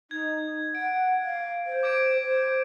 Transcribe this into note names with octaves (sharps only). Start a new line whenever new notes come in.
D#4 G#6
F#5 D7
F5
C5
D6 G#6 D7
C5